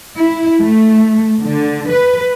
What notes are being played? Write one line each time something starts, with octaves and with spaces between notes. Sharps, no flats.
E4
A3
D3
B4